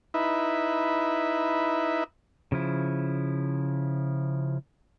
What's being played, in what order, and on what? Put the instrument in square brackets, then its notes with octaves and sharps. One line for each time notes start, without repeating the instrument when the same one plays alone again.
[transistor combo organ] D#4 E4 B4 E5
[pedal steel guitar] C#3 F3 E4